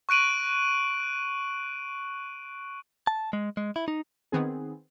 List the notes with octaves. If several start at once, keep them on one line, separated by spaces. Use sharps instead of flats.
C#6 F#6 D7 D#7 F#7
A5
G#3
G#3
E4
D#4
D#3 B3 C4 G#4